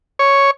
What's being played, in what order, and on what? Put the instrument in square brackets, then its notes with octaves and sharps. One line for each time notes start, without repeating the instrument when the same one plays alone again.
[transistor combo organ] C#5